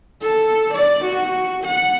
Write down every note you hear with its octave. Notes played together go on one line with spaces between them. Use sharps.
A4
D5
F#4
F#5